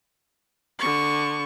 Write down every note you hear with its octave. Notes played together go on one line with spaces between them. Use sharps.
D3 C#6